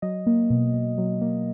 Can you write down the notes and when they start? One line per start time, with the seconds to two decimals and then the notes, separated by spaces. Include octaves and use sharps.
0.02 F#3 D#5
0.27 A#3
0.50 B2
0.74 B2
0.98 F#3
1.21 A#3